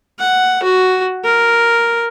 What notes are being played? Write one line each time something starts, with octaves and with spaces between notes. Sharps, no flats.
F#5
F#4
A#4